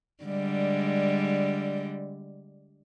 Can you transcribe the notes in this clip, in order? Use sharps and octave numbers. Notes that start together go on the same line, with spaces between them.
D3 G3 G#3